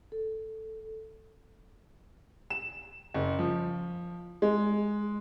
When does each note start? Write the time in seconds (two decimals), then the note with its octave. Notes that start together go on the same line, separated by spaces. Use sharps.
0.12 A4
2.50 E7
3.14 F#1
3.39 F3
4.42 G#3